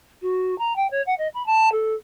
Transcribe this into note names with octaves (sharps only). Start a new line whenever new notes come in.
F#4
A#5
G5
C#5
F#5
D#5
B5
A5
A4